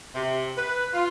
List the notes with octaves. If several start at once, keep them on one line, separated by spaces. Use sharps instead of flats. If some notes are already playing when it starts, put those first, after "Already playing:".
C3
B4
F4